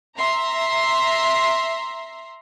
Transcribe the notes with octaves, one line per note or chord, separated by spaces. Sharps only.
E5 A#5 C6